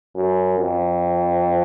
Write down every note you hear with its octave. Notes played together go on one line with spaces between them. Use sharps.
F#2
F2